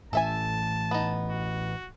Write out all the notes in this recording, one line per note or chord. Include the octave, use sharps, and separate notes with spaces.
A2 E3 A4 E5 G#5 A5
B3 D#4
F#4